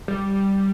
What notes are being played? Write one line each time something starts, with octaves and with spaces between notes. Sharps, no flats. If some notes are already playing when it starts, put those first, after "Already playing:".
G3